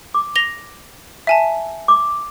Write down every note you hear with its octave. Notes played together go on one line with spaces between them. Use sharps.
D6
A#6 F7 G7
E5 G#5 A5
D6